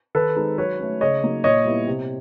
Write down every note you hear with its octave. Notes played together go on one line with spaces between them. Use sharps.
D#3 A4 B4
G#3 C4 D#4
F#3 B4 C#5
A3 C#4
C#3 C#5 D#5
F#3 A#3 D#4
A#2 C#5 D#5
G3 B3 E4
C3